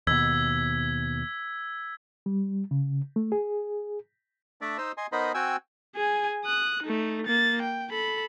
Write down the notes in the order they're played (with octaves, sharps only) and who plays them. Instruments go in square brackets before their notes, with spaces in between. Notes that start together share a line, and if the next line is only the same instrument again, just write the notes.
[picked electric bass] D#2 B2 [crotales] E6 G#6 B6
[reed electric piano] G3
C#3
A3
G#4
[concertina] A3 D4 D5 E5
D#4 C5 D#5 E6
D#5 G#5 C6
B3 D#4 A#4 C5 D#5 B5
C4 F#4 G5 G#5 E6
[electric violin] G#4 G#5
D#6 F#6
A3 D#4
A#3 A6
G5
A4 B5